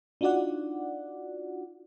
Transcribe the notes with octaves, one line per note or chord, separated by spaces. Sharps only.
D4 D#4 F4 F#4 D5 F#5